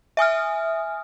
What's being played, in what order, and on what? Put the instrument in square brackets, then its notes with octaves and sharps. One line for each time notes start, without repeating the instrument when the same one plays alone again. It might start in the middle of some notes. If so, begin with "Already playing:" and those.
[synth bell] E5 G#5 D#6 F6